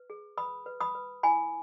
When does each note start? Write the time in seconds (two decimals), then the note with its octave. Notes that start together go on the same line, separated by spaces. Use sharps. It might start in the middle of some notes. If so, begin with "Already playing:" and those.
Already playing: B4
0.10 G#4
0.38 B4 B5 D#6
0.66 B4
0.81 B5 D#6
0.95 B4
1.23 E4 G#5 B5